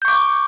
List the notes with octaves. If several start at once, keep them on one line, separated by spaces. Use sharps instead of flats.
C#6 D6 G6